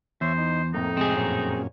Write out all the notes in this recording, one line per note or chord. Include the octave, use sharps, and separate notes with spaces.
E2 C5 C#5 E5
D#4
F2 A2 A#3 D#4
C3 G#3 C4 G#4 D#5
F#2 A#2 C#4